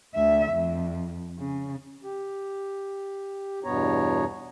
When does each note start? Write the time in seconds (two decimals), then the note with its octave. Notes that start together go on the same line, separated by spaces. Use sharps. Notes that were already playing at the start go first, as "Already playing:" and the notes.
0.14 D2 E5
0.52 F2
1.39 C#3
2.04 G4
3.64 E2 G2 B2 B3 C#5 A#5